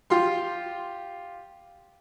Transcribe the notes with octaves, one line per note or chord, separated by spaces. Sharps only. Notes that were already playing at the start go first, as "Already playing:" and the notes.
F4 G4 C6